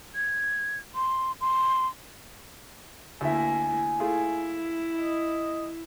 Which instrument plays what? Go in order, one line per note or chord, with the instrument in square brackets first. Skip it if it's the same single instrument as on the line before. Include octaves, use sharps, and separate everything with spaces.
[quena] G#6
C6
C6
[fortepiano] D2 E5 [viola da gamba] A#3 E4 [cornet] G#5
[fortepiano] A3 F4 G#4 [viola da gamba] E4
[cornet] D#5